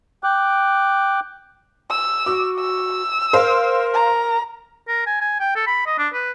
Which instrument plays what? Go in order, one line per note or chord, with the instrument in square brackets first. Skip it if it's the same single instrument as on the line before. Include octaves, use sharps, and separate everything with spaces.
[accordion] G5 D6 F#6
[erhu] E6
[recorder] F#4 [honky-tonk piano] D6
[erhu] E6
[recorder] A#4 [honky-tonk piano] C5 F5
[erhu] A#5
[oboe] A#4
G#5
G#5
G5
A4
B5
D#5
D4
B4